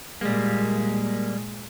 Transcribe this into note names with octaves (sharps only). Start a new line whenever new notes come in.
A#2 G3 G#3 A#3